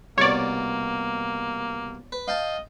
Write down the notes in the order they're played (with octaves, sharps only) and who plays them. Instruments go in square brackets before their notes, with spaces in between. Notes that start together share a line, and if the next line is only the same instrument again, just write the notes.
[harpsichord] C2 B2 [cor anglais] A#3 [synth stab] C#5 D5
[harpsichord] B4
[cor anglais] D#5 [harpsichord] F5 G5 A5